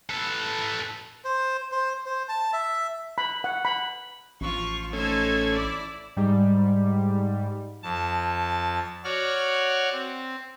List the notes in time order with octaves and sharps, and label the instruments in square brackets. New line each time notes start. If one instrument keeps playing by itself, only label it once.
[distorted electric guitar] A4 B4
[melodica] C5
C5
C5
A5
E5
[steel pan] B5
F#5
B5
[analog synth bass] A1 [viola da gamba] F3 F4 [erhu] C#6
[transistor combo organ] A3 C#4 [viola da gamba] D#4 A4 C5 [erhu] G#6
[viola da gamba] E4 [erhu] D5
[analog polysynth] G#2 G3
[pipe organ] F2 A5
F#4 C#5 D5 F6
C4